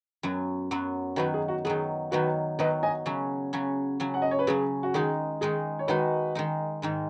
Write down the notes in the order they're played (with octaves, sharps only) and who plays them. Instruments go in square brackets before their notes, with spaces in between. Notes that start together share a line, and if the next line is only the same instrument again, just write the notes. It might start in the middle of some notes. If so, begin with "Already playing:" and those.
[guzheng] F#2 F#3 B3
F#2 F#3 B3
[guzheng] D#3 F#3 B3 [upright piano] F#4 B4
[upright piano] G#4
F#4
[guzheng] D#3 F#3 B3 [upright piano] G#4
[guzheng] D#3 F#3 B3 [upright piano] F#4 B4
[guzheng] D#3 F#3 B3 [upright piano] B4 D#5
[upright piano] D#5 G#5
[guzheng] C#3 F#3 C#4
C#3 F#3 C#4
C#3 F#3 C#4
[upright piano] F#5
D#5
C#5
B4
[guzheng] C#3 F#3 C#4 [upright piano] G#4
[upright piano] F#4
[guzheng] D#3 G#3 D#4 [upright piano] G#4
[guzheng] D#3 G#3 D#4 [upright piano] G#4
[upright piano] C#5
[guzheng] D#3 G#3 D#4 [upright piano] F#4 B4
[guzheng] D#3 G#3 D#4
G#2 D#3 G#3